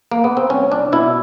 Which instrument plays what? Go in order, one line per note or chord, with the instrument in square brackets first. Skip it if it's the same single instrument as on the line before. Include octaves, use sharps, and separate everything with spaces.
[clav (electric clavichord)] A#3
B3
C4
C2 C#4
D4
B2 E4